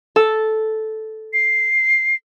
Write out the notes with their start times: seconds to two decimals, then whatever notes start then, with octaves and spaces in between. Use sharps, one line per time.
0.16 A4
1.33 C7